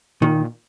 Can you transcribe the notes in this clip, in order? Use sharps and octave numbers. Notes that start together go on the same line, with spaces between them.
A#2 D#3